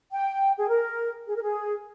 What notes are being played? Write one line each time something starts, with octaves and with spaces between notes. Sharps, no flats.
G5
G#4
A#4
G#4
A#4
G#4